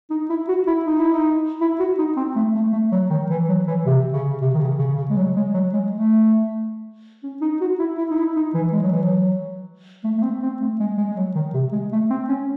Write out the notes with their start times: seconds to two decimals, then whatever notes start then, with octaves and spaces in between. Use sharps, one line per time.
0.10 D#4
0.29 E4
0.48 F#4
0.67 E4
0.85 D#4
0.99 E4
1.13 D#4
1.61 E4
1.79 F#4
1.98 D#4
2.16 C4
2.36 A3
2.55 A3
2.73 A3
2.92 F#3
3.10 D#3
3.30 E3
3.49 F#3
3.67 E3
3.86 C3
4.13 C#3
4.41 C3
4.54 D#3
4.61 C#3
4.79 C#3
4.98 C#3
5.10 G#3
5.17 F#3
5.36 G#3
5.54 F#3
5.73 G#3
5.92 A3
7.23 C#4
7.41 D#4
7.61 F#4
7.79 E4
7.97 E4
8.10 D#4
8.17 E4
8.36 D#4
8.54 E3
8.72 G#3
8.82 F#3
8.92 E3
9.02 F#3
10.04 A3
10.18 A3
10.23 C4
10.42 C4
10.61 A3
10.80 G#3
10.97 G#3
11.11 G#3
11.16 F#3
11.35 D#3
11.54 C3
11.72 G#3
11.92 A3
12.10 C4
12.28 C#4